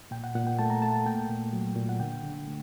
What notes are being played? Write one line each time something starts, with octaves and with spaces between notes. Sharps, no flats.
A#2 G5
F#5
A#2 F#5
G5
A3 A5
A#5
A3 A5
A5
A#3 G5
A#2
F#3
A#2
F#5
D3 G5
D3
A3